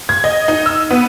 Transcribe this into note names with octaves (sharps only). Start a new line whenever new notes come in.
G#6
D#5
D#4
E6
B3